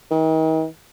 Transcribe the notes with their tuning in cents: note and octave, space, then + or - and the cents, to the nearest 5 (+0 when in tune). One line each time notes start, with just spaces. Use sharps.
D#3 +40